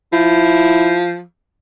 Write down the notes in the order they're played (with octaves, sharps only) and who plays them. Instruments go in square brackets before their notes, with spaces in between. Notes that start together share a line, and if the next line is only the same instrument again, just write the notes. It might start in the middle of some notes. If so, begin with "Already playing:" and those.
[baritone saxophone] F3 [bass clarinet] E4